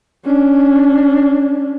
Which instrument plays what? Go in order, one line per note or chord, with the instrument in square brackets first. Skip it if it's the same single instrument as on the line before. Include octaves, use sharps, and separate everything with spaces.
[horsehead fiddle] C#4 D4